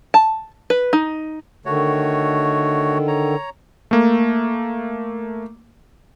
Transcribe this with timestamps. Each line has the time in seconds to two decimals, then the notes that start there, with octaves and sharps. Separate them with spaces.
0.14 A5
0.70 B4
0.93 D#4
1.66 D3 D#3 A3 F#4 C#5
3.08 C#5 A#5
3.91 A3 A#3